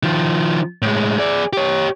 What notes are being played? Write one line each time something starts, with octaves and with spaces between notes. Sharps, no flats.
D#3 F3
A2 G#3
G#4 D5
G4 C#5